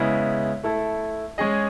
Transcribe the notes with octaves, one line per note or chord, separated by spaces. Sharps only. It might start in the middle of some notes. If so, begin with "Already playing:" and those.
Already playing: C#3 G#3 B3 E4
A3 E4 A4
G#3 C#4 G#4 D#5